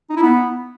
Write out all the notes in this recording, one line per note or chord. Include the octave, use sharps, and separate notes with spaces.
D#4
E4
B3